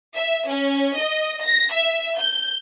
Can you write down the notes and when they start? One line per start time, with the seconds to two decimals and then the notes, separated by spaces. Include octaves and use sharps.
0.16 E5
0.48 C#4
0.97 D#5
1.44 A#6
1.73 E5
2.20 G6